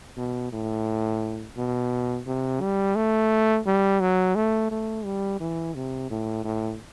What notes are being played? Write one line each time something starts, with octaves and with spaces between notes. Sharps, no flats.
B2
A2
B2
C3
G3
A3
G3
F#3
A3
A3
G3
E3
C3
A2
A2